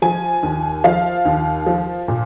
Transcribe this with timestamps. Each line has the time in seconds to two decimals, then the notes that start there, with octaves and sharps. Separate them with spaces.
0.02 F3 G#5
0.43 D#2
0.84 F3 F5
1.25 D#2
1.66 F3
2.08 A#2